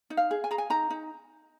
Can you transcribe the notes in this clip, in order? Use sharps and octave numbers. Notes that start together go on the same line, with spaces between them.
D#4
F5
G#4
G#5
G#4 A#5
G#5
D#4 A#5
D#4